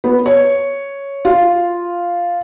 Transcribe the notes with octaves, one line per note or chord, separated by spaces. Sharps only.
B3
C#5
F4